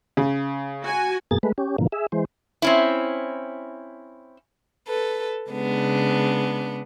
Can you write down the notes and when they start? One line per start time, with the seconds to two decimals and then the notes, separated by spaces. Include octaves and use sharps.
0.17 C#3
0.82 F#4 G#5
1.31 F#2 B2 A#3 G#4 A6
1.43 G#3 A3 B4
1.58 C#4 G4
1.78 G#2 B2 D3 E3 F3 A#3
1.92 G#4 E5
2.12 E3 G#3 C5
2.62 C4 C#4 E4
4.87 A4 B4
5.50 C#3 G#3 B3 D4